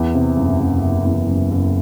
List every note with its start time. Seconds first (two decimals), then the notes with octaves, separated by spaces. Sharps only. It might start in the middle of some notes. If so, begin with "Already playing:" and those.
Already playing: E2
0.14 C3
0.37 F#1
0.60 F#1
0.83 F#1
1.06 E2
1.28 F#1
1.51 F#1